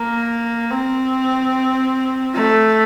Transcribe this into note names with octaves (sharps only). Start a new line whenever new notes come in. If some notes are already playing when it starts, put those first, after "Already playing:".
Already playing: A#3
C4
A3